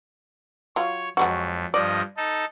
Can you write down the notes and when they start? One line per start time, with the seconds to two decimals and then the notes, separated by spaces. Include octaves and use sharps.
0.76 F#3 F4 C#5
1.17 F2 F#3 G#3 F#4
1.74 G2 F3 D5 D#5
2.17 D#4 A4